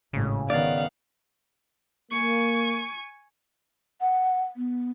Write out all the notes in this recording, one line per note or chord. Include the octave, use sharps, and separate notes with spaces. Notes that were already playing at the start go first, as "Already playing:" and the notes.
G#1 A2 C#3
D#3 B3 D5 F5 F#5
A#3 G#5 C#6
F#5
B3